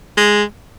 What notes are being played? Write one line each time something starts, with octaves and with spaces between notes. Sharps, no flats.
G#3